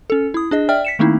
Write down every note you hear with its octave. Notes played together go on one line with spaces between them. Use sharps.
C#4 A4
E4 D#6
D4 G#4 D#5
D5 E5 G5 F6
B6 C#7 E7
D#3 A3 A#3 C4 D#4 E4